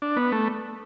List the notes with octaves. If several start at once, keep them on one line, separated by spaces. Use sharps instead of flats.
D4
B3
A3